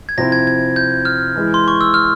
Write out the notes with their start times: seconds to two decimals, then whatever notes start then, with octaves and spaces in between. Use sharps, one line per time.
0.09 G#6
0.18 C3 F3 C4 E4 A#6
0.32 G#6
0.47 G#6
0.76 G6
1.05 F6
1.36 E3 G#3 E4
1.54 C6
1.68 C#6
1.81 E6
1.94 F6